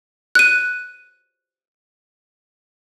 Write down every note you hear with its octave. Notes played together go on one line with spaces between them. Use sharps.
F#6 D#7